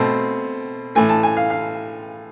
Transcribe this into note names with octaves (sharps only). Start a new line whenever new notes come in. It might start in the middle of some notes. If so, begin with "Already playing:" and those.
Already playing: B2 A3 C4 A5
A2 E3 A3 G#5
A5
G#5
F5
F5